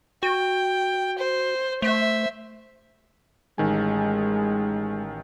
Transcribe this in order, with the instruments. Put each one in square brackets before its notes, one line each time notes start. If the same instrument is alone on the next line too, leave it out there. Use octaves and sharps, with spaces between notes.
[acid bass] F#4 [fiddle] G5
[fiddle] C5
[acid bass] A3 [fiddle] C5 E5
[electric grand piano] A1 D#3 G#5 [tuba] G#3